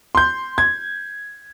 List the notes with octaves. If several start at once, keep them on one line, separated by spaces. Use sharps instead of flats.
C6 G6
G#6